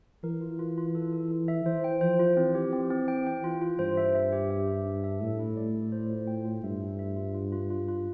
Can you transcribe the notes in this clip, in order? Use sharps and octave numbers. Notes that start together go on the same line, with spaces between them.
E3 A#4
F4
F4
F4
A4
A4
A4
E5
E3 C5
G5
F3 C5
F4
E3 C4
G4
C4
C4
G5
G5
F4
F4
G2 C5
E5
E5
G4
E5
E5
D4
E5
A2 A4
E4
D5
A4
C5
F4
G5
F4
G2 E5
A4
E5
F4
F4
F4
F4
F4